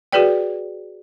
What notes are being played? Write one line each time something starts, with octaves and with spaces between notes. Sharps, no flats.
F#4 G#4 B4 D5 G5